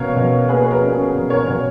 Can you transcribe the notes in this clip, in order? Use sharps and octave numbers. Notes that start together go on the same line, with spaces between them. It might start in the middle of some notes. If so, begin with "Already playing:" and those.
Already playing: B2 C#4 A#4 C#5 F5
B2
A#3 G#4 B4
B4
A#4
C#4
G#4
B2 A#4
A#4 C#5
B2 A#4 C#5